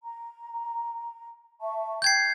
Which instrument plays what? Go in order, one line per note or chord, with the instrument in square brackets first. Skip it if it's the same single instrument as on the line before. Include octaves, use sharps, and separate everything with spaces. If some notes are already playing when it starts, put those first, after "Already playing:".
[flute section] A#5
E5 A5 C#6
[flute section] G5 [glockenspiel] G6 G#6 C7